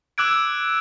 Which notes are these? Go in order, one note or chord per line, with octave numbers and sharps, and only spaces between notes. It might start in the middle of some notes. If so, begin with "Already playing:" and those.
D6 E6 F#6 G#6 D7